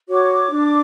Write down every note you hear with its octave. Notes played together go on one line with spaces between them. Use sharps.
F#4 C#5 D6
D4